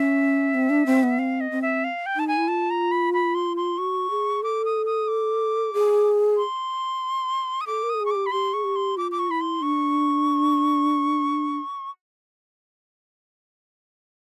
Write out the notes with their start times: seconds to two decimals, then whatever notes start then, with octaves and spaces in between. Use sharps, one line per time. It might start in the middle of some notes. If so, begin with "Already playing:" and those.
Already playing: C#4 E5
0.55 C4
0.70 D4
0.86 C4
1.03 B3
1.18 C4 F5
1.40 D#5
1.51 C4
1.62 E5
1.84 F5
2.06 G5
2.16 D#4 A5
2.28 G#5
2.37 E4
2.48 F4 A5
2.70 A#5
2.91 B5
3.13 B5
3.35 C6
3.57 C6
3.78 F#4 C#6
4.10 G#4
4.43 A4 D6
4.65 D#6
4.86 D#6
5.08 D6
5.73 G#4
6.37 C6
7.61 D#6
7.67 A4 D6
7.83 A#4
7.89 D#6
7.94 A4
8.00 G#4
8.05 C#6
8.11 G4 D6
8.26 B5
8.32 G4 C6
8.53 G#4 C#6
8.64 G4
8.76 C6
8.97 F4 D6
9.11 D6
9.19 C#6
9.29 E4 B5
9.41 C6
9.61 D4 C#6